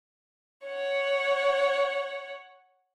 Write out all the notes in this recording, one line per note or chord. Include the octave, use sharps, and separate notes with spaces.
C#5 F#5